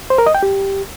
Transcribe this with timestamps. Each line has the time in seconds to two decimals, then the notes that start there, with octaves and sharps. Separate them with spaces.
0.10 C5
0.18 A#4
0.26 D#5
0.35 G5
0.43 G4